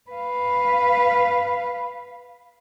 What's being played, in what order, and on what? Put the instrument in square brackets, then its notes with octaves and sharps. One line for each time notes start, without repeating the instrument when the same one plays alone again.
[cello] B4 F5